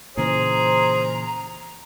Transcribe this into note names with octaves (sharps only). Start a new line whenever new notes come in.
A#2 C#3 E3 G#4 C5 A#5